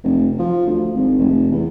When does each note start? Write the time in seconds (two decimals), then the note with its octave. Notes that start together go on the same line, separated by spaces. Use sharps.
0.04 F1
0.39 F3
0.67 D2
0.95 G#1
1.19 F1
1.51 E2